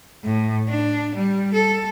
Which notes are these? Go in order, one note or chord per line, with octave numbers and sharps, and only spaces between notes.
A2
D4
G3
A4